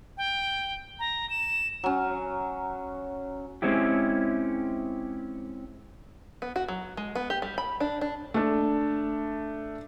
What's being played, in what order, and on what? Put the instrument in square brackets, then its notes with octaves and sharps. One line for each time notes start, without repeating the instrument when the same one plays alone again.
[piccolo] G5
A#5
E7
[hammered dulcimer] F#3 C#4
[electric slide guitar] G#3 C4 C#4 E4 G4
[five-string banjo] B3
F#4
F#3
G#3
B3
G4
G3
B5
D4
D4
[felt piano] A3 D4